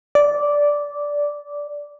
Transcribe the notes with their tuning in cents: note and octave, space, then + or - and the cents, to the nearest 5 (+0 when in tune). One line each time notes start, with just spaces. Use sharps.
D5 -10